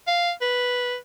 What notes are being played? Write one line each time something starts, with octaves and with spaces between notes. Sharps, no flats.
F5
B4